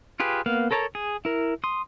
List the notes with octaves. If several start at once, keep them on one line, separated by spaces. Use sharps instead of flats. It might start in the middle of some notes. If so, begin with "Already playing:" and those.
F4 G4 G#4 B4
A#3 B3 F5
A4 A#4 C#5 A5 A#5
G#4
E4 A#4
C6 D#6